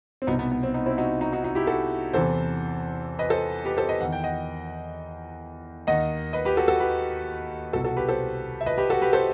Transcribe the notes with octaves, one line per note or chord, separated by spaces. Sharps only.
C4
C2 B2 B3 D#4
B3
B3
C4
B3 D#4
C4 E4
D#4 F#4
D#4 F#4
D#4 F#4
D#4 F#4
E4 G4
F#4 A4
E2 C3 E3 A4 C5
B4 D#5
A4 C5
G4 B4
A4 C5
B4 D#5
E2 D#3 F#5
G5
D#5 F#5
D#2 D#3 D#5 F#5
B4 D#5
G4 B4
F#4 A4
F#4 A4
G4 B4
C2 B2 F#4 A4
F#4 A4
G4 B4
A4 C5
E5
B4 D#5
G4 B4
F#4 A4
G4 B4
A4 C5